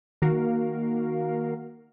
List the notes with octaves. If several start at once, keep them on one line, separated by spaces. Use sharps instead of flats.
D#3 A#3 F#4 A#4 F5